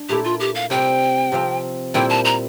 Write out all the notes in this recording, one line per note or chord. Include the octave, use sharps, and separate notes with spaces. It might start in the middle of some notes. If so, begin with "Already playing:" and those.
Already playing: D4
A#2 A3 E4 G4
F4
G4
F5
C3 G3 C4 G5
C3 F3 C4 F4
A#2 G3 C4 E4 G5
A5
A#5